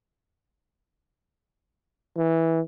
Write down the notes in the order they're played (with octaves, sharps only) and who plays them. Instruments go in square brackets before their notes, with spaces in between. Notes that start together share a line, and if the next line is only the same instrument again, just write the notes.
[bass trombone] E3